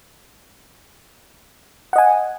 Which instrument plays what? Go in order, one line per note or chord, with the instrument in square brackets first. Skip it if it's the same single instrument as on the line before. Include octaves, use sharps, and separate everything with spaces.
[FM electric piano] F#5
D#5
G#5